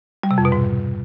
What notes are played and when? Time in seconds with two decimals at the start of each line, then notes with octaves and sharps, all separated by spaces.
0.23 G3
0.31 C3
0.38 F2
0.45 B2
0.52 G#2